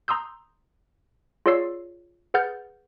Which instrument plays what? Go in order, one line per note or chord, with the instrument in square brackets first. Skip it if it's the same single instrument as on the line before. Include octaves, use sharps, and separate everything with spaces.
[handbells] A#5 C6 D#6 E6 G6
F4 G#4 C#5 D5 E6 C7
G#4 B4 F#5 F6 G6 A6